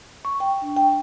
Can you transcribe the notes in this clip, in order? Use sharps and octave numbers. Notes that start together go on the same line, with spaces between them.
C#6
G5
D4
G5